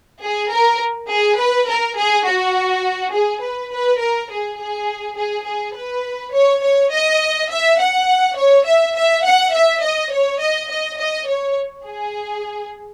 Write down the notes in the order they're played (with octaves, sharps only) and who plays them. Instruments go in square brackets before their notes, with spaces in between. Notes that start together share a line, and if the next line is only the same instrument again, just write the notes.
[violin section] G#4
A#4
G#4
B4
A#4
G#4
F#4
G#4
B4
B4
A#4
G#4
G#4
G#4
G#4
B4
C#5
C#5
D#5
E5
F#5
C#5
E5
E5
F#5
E5
D#5
C#5
D#5
D#5
D#5
C#5
G#4